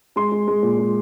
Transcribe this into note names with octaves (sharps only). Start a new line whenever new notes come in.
G#3 C6
G#3
G#3
A#2
G#3